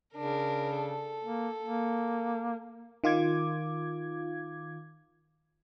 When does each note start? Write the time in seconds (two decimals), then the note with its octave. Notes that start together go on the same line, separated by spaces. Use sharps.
0.15 C#3 D4 A#4
0.77 A4
1.24 A#3
1.64 A#3
3.04 D#3 F4 D6 G#6